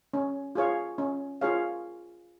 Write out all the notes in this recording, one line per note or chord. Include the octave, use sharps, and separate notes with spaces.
C#4
F4 G#4 C#5 F5
C#4
F4 G#4 C#5 F5